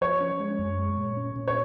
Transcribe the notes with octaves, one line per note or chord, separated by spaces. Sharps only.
F3 C#5
C#4
G#3
F#2
G#3
A#2
C#4
A#2
C#5